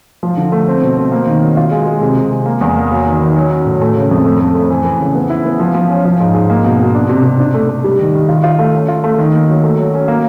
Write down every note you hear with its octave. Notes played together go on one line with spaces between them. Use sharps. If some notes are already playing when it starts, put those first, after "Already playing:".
F3
D3
A3
C4
B2
C4
A#3
D#3
F#3
F4
G#3
G#3
C3
C3
G#3
A#3
E2
A#3
F#3
D#3
D#3
F#3
C#4
A2
A3
C#3
F2
A3
A3
A3
E3
E3
C#3
B3
E4
B3
F3
F3
C#4
F3
G#2
G#2
A#3
B2
B2
D4
C3
C3
D4
A3
A3
G3
D#3
D#3
F4
F4
A3
C#4
F4
A3
D#3
A#3
F#3
A3
F#3
C#4
A#3